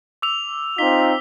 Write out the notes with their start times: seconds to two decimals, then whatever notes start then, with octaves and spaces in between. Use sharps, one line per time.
0.22 D6 E6 F7
0.78 C4 D#4 F4 B6 G7